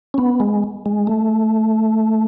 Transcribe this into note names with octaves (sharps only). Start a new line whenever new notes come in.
C#4
B3
G#3
G#3
A3